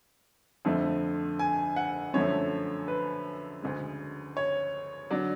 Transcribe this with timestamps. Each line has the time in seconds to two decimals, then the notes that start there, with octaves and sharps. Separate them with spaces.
0.65 F2 D3 F3 A3
1.39 G#5
1.76 F#5
2.14 F#2 D3 F3 A3 C#5
2.88 B4
3.62 D2 C#3 G#3
4.37 C#5
5.10 D3 F#3 D5